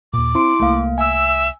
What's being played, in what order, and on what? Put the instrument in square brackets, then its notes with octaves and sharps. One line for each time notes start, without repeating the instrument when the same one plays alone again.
[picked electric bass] D#2 A#2 [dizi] D6
[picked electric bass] C4 [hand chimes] E4 C6 D7
[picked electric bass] C2 A3 [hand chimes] A#3 F5
[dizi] E5 [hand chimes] G#5 E6